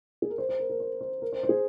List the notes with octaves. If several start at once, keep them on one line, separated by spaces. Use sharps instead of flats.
G#4
A#4
C5
C5
A#4
A#4
C5
C5
A#4
C5
C5
G#4